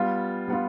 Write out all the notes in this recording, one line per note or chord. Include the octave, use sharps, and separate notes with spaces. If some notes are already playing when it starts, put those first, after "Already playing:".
Already playing: G3 B3 F4
G3 B3 F4